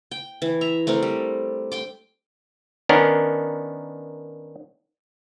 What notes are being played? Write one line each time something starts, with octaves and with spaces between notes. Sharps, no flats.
G5
E3
E5 A#5
A3 C4 D4 A#4
G3
G5 C6 D6
D#3 B3 C#4 D4 A#4